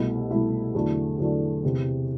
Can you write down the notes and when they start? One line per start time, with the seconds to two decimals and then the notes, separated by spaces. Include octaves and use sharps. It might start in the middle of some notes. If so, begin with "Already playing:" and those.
Already playing: C2 B2 A3 E4
0.31 C2 B2 A3 E4
0.75 E2 D3 F#3 A3 D4
1.19 E2 D3 F#3 A3 D4
1.63 E2 C3 E3